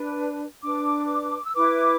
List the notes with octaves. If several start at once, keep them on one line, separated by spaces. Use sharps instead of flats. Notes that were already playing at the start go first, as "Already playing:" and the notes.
Already playing: D4 B4
D4 B4 D6
E6
E4 B4 D6